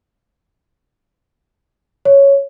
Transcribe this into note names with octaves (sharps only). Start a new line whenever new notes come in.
C#5